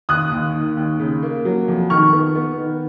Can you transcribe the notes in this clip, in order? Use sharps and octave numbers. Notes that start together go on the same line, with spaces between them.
D#2 D#6 F#6
D#2
D#3
D#2
C#3
A#3
F#3
F2
D#3 C#6 F6
B3
B3
D#3